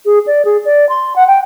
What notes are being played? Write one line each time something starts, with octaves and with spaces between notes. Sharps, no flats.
G#4
D5
G#4
D5
C6
F#5
G5